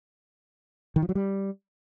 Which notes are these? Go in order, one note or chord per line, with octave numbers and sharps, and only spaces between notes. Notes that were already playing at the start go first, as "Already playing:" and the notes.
D#3
F3
F#3
G3